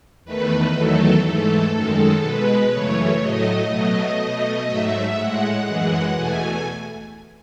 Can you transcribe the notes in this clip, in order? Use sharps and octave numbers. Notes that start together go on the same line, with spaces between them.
E2 D#3 A3 B4
E2 D#3 F#3 A3 A4
G#2 E3 A3 A4
F#2 D#3 G#3
B2 G#3 B4
F#2 C#3 E3 A3 C#5
A2 F#3 A3 D#5
B2 F#3 A3
B2 A3
G#2 F#3 A3 E5
A2 G#3 F#5
F#2 E3 G#3
E2 B2 A3 G#5